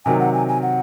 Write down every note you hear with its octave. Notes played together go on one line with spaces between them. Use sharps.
C3 D#3 F#3 G#5
F#5
G#5
G#5
F#5